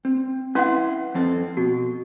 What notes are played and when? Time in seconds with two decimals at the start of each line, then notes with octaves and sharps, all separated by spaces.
0.05 C4
0.55 C#4 E4 B4 F#5 C6
1.15 F2 C4 A4
1.57 B2 F#4